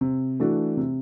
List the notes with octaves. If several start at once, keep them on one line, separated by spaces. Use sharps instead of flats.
C3
E3 A3 D4 F#4
C3